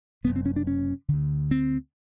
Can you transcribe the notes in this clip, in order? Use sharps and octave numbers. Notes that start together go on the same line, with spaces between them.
F#1 E2 C3 B3
C4
C#4
D4
C#4
D3
D2
C4